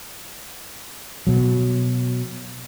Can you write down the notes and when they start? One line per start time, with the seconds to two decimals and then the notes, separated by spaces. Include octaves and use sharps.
1.27 B2 F#3